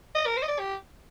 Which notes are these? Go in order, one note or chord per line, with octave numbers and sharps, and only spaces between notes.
D#5
A#4
C5
D#5
D5
G4